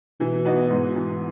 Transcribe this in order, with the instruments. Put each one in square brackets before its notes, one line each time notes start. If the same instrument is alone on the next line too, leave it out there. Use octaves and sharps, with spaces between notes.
[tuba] B2 [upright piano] E3
[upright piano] B3 D#4 F#4
G#2
E3 B3